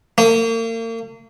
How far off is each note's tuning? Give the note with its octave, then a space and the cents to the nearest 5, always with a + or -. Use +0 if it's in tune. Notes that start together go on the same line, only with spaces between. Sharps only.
A#3 -40